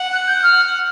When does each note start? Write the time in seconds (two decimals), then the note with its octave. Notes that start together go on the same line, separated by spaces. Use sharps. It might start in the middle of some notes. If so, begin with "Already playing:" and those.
Already playing: F#5
0.13 F#6
0.27 G6
0.43 F6